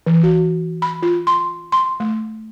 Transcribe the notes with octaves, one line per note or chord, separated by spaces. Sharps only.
E3
F#4
B5
F4
C6
C6
A3